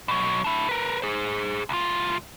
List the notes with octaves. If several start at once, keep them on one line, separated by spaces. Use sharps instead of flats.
B2 F#3
D4 E4
A#4 B4
G#4 C5
C2 F4